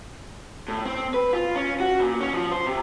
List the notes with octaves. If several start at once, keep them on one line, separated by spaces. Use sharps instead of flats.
A2
C4
B4
F4
C#4
F#4
A#2
C#4
F3
C5
C3